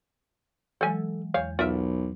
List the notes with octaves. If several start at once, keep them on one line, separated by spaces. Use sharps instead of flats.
E3 F#3 G#3 A4 G#5
E2 C#5 F5 G6
B1 F#3 F4 A#4 E5